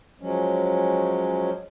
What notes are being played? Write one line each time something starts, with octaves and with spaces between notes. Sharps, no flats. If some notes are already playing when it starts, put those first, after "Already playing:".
F3 F#3 G#3 C#4